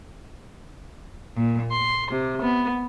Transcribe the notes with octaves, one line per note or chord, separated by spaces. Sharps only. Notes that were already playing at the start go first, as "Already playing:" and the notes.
A#2
C6
C3
B3